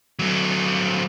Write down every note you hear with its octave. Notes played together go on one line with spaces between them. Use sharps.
F#3 A3